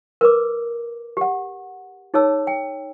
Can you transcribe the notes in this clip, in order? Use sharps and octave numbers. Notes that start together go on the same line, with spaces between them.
A#4 B4 D6
G4 F#5
D#4 G#4 C#5 A5 E6
G5